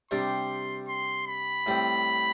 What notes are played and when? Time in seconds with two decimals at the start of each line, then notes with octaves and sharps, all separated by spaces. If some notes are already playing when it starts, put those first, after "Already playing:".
0.11 C3 G3 D4 G4 C6
0.88 C6
1.27 B5
1.66 A2 G3 C4